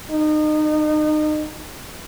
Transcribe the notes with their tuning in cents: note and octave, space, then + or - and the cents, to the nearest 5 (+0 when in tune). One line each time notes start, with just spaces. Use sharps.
D#4 -30